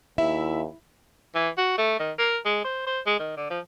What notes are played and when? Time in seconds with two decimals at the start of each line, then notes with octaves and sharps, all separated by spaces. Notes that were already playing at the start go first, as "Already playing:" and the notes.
0.18 D#2 E4 E5
1.35 E3
1.58 F#4
1.78 A3
1.99 D#3
2.19 A#4
2.45 G#3
2.65 C5
2.87 C5
3.06 G#3
3.19 D#3
3.37 D3
3.50 F3